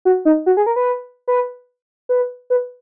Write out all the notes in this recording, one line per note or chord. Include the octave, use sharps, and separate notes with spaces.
F#4
D#4
F#4
G#4
A#4
B4
B4
B4
B4